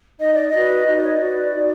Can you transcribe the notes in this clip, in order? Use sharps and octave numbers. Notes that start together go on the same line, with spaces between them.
D#4 D#5
D5
D#5
F#4 B4
D#4 D#5
D5
C#5
D5
F#4 B4
D#4